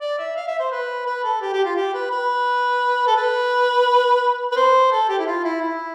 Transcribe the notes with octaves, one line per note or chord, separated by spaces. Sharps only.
D5
E5
F5
E5
C5
B4
B4
A4
G4
G4
F4
G4
B4
B4
A4
B4
B4
C5
A4
G4
E4
F4
E4
E4